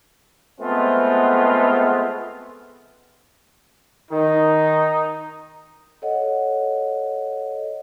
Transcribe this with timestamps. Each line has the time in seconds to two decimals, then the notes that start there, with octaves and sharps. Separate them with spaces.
0.60 G#3 A3 B3 C4 F4 G#4
4.11 D#3 D#4
6.02 A4 C#5 D#5 F#5